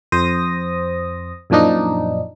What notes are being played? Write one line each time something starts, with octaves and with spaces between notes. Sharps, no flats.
F2 C5 D#6 A#6
F#2 A#2 F3 D4 D#4